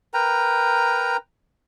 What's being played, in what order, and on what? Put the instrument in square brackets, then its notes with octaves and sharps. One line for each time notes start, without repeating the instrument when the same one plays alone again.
[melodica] A#4 B4 G5 A#5